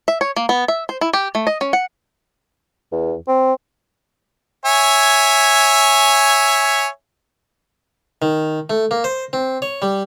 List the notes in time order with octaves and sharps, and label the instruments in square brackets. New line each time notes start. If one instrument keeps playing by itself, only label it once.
[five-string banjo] E5
C#5
A#3
B3
E5
C5
E4
G4
A3
D#5
C#4
F#5
[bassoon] E2
C4
[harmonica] C#5 E5 G#5
[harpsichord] D#3
A3
A#3
C5
C4
C#5
G3